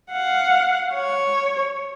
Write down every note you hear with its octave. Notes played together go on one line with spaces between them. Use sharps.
F5 F#5
C#5